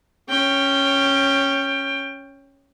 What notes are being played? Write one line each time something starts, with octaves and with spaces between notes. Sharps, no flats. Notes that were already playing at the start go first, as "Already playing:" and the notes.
C#4 G5